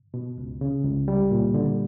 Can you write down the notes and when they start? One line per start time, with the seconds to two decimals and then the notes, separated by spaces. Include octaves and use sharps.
0.14 B2
0.38 C#2
0.61 C#3
0.84 C#2
1.08 G3
1.31 A#2
1.54 D3